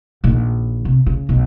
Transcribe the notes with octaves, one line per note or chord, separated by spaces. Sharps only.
A#1 D#3
C3
C#3
B1